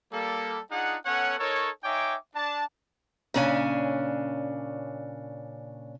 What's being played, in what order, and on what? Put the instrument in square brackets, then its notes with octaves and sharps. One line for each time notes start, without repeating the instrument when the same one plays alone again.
[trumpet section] G3 A#3 A4
D4 D#4 F4 G#4 F#5
B3 C#4 A4 C#5 F#5
D#4 A4 A#4 C#5
D#4 C#5 E5 G5 G#5 D6
D4 A5
[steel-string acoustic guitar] A#2 C#3 C#4 D4 G#5